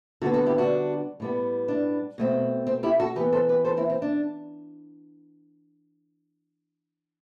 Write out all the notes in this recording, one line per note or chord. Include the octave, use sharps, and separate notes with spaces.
D3 G3 B3 F#4 A4
F#4 A4
E4 G4
D4 F#4
A2 G3 B3
D4
B2 A3 C4
C4
E4 G4
F#4 A4
E3 B3 G4 B4
A4 C5
G4 B4
A4 C5
C4 E4
C4
D4